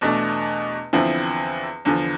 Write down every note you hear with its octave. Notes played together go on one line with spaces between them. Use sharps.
E2 B2 A3 D4
E2 D3 F3 C4 E4
E2 D3 F3